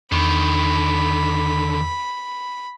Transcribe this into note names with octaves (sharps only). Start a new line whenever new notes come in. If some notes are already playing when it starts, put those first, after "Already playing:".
E2 D3 D#3 B5